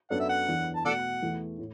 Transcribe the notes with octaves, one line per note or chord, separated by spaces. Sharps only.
F#2 F#3 B3 D4 A4 F#5
E5
F#5
E2 E3 D4
A5
B2 A3 F#4 A4 D5 F#5
E2 E3 A3
A2